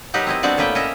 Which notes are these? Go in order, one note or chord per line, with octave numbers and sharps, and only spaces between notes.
F#3 D#4 G4 A#4 B4
C4 E4 D#5
G3 B3 C4 D4 F#4 D5
A2 A#3 B3 B4 E5 G5
C#4 A#4 D#5 E5